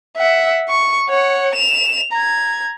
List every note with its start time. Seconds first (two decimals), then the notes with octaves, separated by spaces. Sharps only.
0.17 E5 F#5
0.69 C#6
1.09 C#5 F#5
1.55 E7 F7
2.13 A#5 G#6